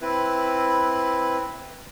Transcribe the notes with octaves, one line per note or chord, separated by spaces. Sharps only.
C4 E4 B4